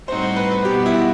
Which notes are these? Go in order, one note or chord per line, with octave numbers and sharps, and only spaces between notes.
A2 G3 C4 D#4 F#4 C5
B4
B4
B2 G3 B3 G4
E4
F#4